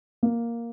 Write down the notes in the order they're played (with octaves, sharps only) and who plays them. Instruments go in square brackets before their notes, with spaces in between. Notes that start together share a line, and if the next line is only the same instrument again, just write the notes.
[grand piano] A#3